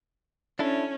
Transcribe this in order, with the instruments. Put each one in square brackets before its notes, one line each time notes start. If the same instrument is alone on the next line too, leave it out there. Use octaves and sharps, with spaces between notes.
[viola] C#4 [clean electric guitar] D4 E4 A4